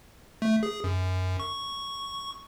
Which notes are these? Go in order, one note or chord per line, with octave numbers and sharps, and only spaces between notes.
A3
G#4
F#2
C#6